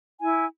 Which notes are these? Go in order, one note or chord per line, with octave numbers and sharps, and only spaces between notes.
E4 G#5